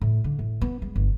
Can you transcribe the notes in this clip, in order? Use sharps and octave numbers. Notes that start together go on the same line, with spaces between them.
A2
D3
A2
B3
G#3
G1